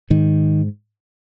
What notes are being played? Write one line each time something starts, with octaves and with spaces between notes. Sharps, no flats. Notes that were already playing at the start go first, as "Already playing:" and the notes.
G#2 D#3